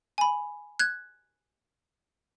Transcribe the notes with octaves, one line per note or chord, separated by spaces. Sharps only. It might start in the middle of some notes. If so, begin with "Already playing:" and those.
G#5 B5
F#6 G#6